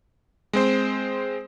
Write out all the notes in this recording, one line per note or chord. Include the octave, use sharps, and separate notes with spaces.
G#3 C4 C5